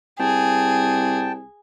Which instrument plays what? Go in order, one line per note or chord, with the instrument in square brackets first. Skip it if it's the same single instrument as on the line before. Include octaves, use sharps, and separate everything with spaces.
[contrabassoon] C2 [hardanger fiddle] G#4 [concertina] G5 A5